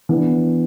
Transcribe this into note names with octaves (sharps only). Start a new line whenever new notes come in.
E3 B3 D4